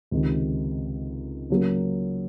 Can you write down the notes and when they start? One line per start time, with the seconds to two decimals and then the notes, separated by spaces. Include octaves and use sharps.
0.11 C#2 C3 D#3
1.50 C#3 F#3 A#3